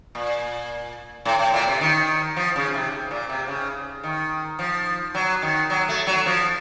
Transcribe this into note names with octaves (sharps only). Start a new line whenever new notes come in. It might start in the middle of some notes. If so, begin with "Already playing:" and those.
A#2
A2
A2
A#2
C3
D#3
F3
C#3
C3
A#2
C3
C#3
D#3
F3
F#3
D#3
F#3
A3
F#3
F3